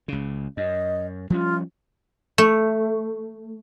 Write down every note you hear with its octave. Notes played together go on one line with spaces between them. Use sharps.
C#2 C#3
F#2 D#5
F3 G3 C#4 F4
A3